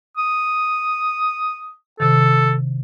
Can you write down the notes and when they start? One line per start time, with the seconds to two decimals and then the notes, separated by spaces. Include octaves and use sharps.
0.17 D#6
2.00 C3 D#3 A4